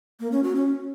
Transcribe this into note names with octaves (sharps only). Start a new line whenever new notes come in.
A#3
C#4
F#4
C#4